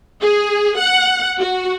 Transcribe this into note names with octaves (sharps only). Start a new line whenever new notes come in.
G#4
F#5
F#4